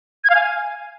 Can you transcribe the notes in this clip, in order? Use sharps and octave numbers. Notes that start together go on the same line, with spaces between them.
G#6
F5
G#5